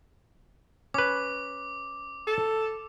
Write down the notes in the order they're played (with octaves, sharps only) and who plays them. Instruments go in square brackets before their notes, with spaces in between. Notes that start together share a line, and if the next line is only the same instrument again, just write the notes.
[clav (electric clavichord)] C#4 B4 [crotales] D6
[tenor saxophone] A4